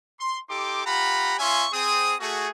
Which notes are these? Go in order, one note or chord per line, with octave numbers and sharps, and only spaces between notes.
C6
D#4 G4 A4 C6 D6
F4 G4 F#5 A#5 B5
C#4 F4 E5 G#5 C6 C#6
C4 G#4 D#6
A3 F#4 G#4